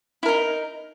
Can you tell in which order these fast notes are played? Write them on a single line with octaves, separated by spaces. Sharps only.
E4 A#4 D#4